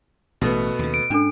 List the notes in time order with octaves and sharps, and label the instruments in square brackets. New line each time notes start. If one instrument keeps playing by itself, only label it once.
[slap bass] A1 [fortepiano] B2 A3 B3
[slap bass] D#2 C#3
[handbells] D7
[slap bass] G#2 [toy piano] C#4 D4 A4